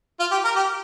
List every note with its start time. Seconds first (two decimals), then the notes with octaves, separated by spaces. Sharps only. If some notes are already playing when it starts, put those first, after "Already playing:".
0.20 F4
0.31 G4
0.44 A#4
0.56 G4